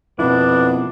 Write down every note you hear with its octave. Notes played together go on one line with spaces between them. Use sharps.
F2 B2 A#3 B3 D4 E4